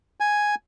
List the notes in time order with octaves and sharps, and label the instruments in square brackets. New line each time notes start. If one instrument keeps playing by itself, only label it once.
[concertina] G#5